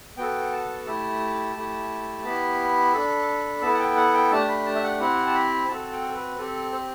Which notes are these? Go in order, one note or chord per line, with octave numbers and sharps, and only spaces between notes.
B3 F#4 A4 G5
A5
A3 E4 G4
A3 E4 G4
B3 E4 G4 B5
D4 A4
B3 E4 A4 A5
F#5
G5
F#5
G5
A3 D4 G4 A5
B5
A5
E5
F#5
C4 E4 G4 F#5
A5
B5
C4 F#4 A4 A5
G5
A4
B4
C4 G4 A4
C5